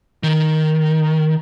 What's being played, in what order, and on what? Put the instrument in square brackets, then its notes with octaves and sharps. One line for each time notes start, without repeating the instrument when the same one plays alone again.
[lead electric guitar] D#3